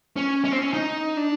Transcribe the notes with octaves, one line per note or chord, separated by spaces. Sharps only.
C#4
C#4
C4
C#4
D#4
D4